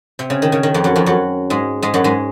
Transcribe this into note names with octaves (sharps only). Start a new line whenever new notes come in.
C3
C#3
D#3
C#3
D#3
F2 F3
F#2 F#3
F2 F3
F#2 F#3
G#2 G#3
G#2 G#3
F#2 F#3
G#2 G#3